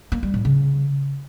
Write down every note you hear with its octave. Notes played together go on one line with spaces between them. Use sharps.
A#3
G3
A2
C#3